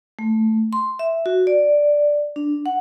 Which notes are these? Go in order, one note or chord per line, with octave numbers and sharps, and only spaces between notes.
A3
C6
E5
F#4
D5
D4
F#5